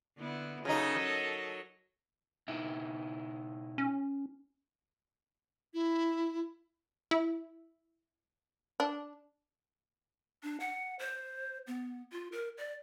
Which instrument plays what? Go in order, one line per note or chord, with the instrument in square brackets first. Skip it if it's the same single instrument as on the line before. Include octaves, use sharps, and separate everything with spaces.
[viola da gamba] D3 B3 E4
[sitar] C#3 F#3 D#4 [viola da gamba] A4 A#4 D#5
[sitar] F#3
[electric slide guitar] B2 D#4 E4
[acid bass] C#4
[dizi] E4
[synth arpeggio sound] E4
[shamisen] D4
[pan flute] D4
F#5
C5
B3
F4
A#4
D5